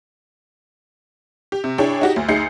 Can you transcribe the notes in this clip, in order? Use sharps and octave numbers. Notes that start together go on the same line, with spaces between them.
G4
C3
D4 E4 G#4 C#5 G5
D#4 F#4 G4
D2
D2 D#4 G#4 G6 C7 C#7